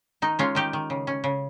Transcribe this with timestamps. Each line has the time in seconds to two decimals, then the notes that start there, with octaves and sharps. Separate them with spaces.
0.22 D#3 D#4
0.39 G#3 C#4 F4
0.55 D#3 D#4 G4
0.73 D#3
0.90 C#3
1.07 C#4
1.24 C#3